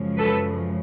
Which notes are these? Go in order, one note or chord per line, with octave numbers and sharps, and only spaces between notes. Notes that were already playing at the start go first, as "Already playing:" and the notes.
Already playing: F#2 C#3 F3 G#3
A4 B4